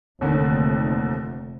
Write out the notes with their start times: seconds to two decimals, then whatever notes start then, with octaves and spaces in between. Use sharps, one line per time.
0.21 F1 D#2 D3 D#3